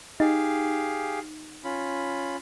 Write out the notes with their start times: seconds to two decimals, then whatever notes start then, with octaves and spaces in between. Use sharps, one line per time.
0.20 D#4 G4 G#4 F5
1.64 C#4 F4 B5